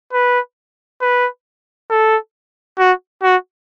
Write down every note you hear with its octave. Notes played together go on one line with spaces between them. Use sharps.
B4
B4
A4
F#4
F#4